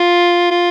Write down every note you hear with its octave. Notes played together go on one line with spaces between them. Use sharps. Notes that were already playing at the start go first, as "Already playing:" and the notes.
Already playing: F4
F4